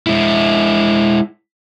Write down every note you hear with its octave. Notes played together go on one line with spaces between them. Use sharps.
G#3 E4